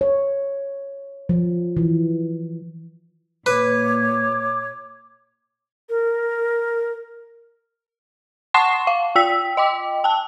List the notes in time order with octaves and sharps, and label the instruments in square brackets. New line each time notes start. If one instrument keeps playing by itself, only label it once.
[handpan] C#5
F3
E3
[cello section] A#2 [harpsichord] B4 [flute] C#5 [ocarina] D6
[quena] A#4
[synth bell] F#5 A5 C6 C#6 C7 E7
F5
F4 G5 E6 B6
D#5 G5 D6
G5 A5